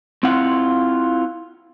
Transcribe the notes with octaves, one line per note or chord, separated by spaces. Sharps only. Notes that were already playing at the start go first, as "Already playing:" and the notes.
C4 E4 F4 F#5